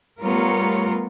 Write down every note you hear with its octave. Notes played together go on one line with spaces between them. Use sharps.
G3 A3 B3 F4 A#4 C#5